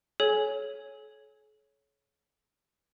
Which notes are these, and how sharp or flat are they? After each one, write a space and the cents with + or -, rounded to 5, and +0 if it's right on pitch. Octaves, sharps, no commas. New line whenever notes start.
A4 -45 C#5 +0 G#5 +0